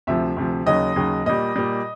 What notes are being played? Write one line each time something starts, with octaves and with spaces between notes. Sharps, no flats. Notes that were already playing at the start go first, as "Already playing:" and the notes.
D2 C3 F3 E5
D2 C3 F3
D#2 C#3 F#3 D#5
D#2 C#3 F#3
A#2 G3 D#5
A#2 G3